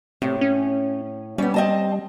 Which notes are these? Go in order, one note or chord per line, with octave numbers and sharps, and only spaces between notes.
A2 C3
C#4
G3 B3 C#4
C4 D#5 A5